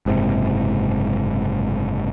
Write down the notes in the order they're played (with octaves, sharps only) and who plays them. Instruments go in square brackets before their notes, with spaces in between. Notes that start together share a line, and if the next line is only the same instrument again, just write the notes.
[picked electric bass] F#1 G#2 C3